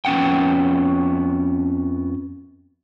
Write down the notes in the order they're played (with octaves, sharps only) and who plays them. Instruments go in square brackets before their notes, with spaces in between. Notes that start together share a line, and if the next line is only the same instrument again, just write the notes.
[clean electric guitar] F2 B3 C#4 F#5 G5